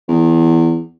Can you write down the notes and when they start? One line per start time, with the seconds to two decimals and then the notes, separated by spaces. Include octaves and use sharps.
0.08 E2